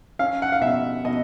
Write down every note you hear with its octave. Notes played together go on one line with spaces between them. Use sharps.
C#4 F5
F#5
F5
B2 E5
B2 D#5